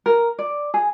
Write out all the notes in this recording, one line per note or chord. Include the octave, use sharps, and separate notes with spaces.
A#4
D5
G#4